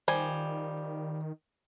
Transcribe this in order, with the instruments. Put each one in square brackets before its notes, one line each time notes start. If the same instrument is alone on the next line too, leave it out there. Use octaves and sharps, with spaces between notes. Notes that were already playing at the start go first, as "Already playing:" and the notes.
[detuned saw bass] D#3 [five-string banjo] F3 G3 G#5